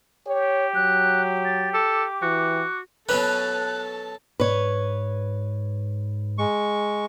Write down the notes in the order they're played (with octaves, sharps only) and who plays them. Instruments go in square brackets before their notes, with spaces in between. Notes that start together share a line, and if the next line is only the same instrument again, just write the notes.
[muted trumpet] G4 [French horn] C#5
[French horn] F#3 [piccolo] F#6
[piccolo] A6
[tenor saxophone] A4 [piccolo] D6
[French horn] E3 [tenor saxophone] F#4
[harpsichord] B2 F#3 C#4 [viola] A4 A5 [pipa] B4 [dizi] F#6
[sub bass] G#2 [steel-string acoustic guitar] B4 C#5
[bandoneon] G#3 C#6